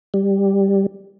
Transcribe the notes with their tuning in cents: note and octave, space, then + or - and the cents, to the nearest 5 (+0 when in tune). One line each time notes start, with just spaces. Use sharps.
G3 +5